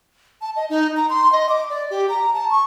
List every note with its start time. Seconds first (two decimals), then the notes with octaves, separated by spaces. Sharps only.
0.42 A5
0.56 D#5
0.70 D#4
0.97 A#5
1.10 C6
1.33 D#5
1.49 D6
1.70 D5
1.90 G4
2.09 A#5
2.34 A5
2.51 C#6